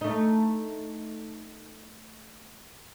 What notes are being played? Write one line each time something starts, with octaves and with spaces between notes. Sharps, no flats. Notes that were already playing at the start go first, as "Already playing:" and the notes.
A3 D#4